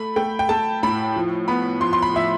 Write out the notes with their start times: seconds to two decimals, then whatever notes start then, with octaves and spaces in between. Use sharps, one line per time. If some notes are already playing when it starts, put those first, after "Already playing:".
Already playing: A3 B5
0.16 A3 G5
0.39 G5
0.49 A3 A5
0.83 A2 B5
1.16 F3
1.48 B3 B5
1.81 F3 C6
1.93 C6
2.02 B5
2.14 F3 E5